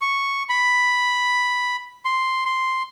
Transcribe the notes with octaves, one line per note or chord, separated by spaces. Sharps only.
C#6
B5
C6
C6